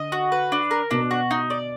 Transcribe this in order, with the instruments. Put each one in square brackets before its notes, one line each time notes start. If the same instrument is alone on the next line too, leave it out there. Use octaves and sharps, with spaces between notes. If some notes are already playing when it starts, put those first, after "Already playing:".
Already playing: [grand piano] D3 [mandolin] D#5
[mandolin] F#4
B4
D4
A#4
[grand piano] B2 [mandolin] D4
[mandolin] F#4
D#4
D5